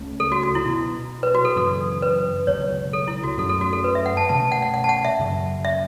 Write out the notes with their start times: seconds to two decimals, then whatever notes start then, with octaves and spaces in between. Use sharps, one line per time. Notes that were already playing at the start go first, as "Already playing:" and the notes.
Already playing: C#2 C#3 A3 C#4
0.20 A4
0.32 F#4
0.43 F#4
0.55 E4
0.65 B2 B3
1.23 B4
1.35 F#4
1.45 A4
1.56 F#2 C#3 E3 A4
2.02 B4
2.47 C#2 B2 F#3 C#5
2.93 A4
3.08 E4
3.24 F#4
3.38 F#2 F#3 A3 C#4 A4
3.49 A4
3.61 F#4
3.73 A4
3.84 B4
3.95 E5
4.06 F#5
4.17 A5
4.29 B2 A3 C#4 A5
4.40 A5
4.52 F#5
4.62 F#5
4.74 F#5
4.84 A5
4.89 F#5
5.05 E5
5.19 F#2 C#3 F#3
5.65 E5